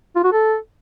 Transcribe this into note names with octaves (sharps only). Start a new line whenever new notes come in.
F4
F#4
A4